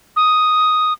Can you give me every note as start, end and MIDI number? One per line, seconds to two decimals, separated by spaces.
0.16 0.93 87